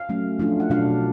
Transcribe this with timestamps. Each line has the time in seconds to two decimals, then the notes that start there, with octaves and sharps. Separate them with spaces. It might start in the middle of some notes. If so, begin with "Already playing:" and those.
Already playing: F5
0.09 F#3 A3 C#4
0.39 F3 A3 D4 F4
0.60 F#5
0.70 B2 F#3 A3 D4 F4 F5